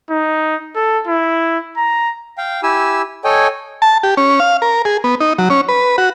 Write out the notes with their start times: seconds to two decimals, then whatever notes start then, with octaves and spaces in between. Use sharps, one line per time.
0.10 D#4
0.75 A4
1.07 E4
1.77 A#5
2.38 F5 G5
2.63 E4 G4 G#5 E6
3.24 A4 C#5 D#5 G5 G#5
3.82 A5
4.03 G4
4.17 C#4
4.40 F5
4.62 A#4
4.85 G#4
5.04 B3
5.20 D#4
5.38 F#3
5.50 C#4
5.69 B4
5.98 F#4